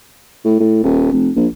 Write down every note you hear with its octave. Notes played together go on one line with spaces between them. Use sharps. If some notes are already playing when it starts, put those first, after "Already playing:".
A2
A2
D#1
F1
A#1